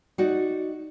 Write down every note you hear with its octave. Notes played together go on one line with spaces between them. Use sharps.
D#4 F#4 D5